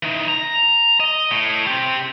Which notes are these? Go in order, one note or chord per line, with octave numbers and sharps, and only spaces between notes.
E3 D#4
A#5
D#5
A2
C4 G4